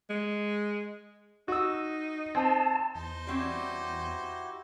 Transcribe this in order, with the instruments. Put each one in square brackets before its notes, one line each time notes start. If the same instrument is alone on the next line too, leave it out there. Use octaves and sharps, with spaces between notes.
[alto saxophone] G#3
[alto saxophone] D#4 [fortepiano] F#4 E6
[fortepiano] C4 [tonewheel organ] A5
[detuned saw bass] E2 [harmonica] D#4 C5
[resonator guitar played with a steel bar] G3 C4 C#4 [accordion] E4 F#4 G4